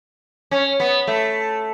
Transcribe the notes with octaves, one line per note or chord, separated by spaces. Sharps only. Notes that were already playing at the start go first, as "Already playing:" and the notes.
C#4
B3
A3